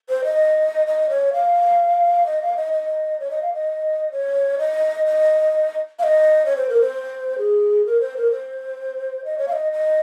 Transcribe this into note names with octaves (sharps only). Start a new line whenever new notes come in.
C5
D#5
D#5
C#5
F5
D#5
F5
D#5
D#5
C#5
D#5
F5
D#5
C#5
D#5
D#5
F5
D#5
C#5
C5
A#4
C5
G#4
A#4
C5
A#4
C5
D#5
C#5
F5
D#5
D#5